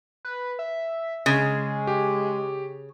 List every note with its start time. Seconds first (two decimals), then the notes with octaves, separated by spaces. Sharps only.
0.25 B4
0.59 E5
1.26 C#3 G#3
1.87 G4